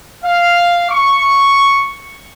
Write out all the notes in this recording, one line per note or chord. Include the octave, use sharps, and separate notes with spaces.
F5
C#6